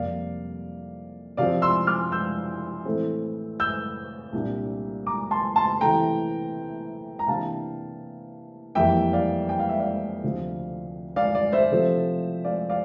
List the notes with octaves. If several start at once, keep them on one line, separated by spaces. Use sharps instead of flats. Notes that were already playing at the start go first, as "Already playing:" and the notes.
Already playing: F2 C3 G3 A#3 D5 F5
C3 F3 C4 D5 F5
C6 E6
D6 F6
E6 G6
A2 E3 A3 C4
E6 G6
C2 A#2 G3 D4
A#5 D6
A5 C6
A5 C6
C3 E3 A3 G5 A#5
A#5
C3 E3 A#3 D4 F5 A5
F2 E3 G3 A#3 E5 G5
D5 F5
G5
F5
E5
D5 F5
D2 C3 F3 C4
D5 F5
D5
C5 E5
C3 F3 A3 C4
D5 F5
D5 F5